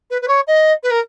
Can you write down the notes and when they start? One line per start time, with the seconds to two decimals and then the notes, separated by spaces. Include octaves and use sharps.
0.10 B4
0.22 B4
0.28 C#5
0.47 D#5
0.83 B4
0.91 A#4